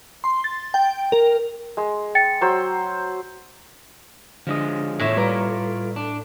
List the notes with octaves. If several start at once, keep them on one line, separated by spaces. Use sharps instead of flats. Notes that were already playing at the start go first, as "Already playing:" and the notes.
C6
A6
G5
A#4
G#3
G5 A6 C#7
F#3 C5 E6
D3 F3 G#3 D4 D#6
E2 A2 F4 E5
G3 F4 B4 D5 A#5
D4